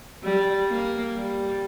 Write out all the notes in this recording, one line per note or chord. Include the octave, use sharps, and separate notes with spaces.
G3
A#3
G3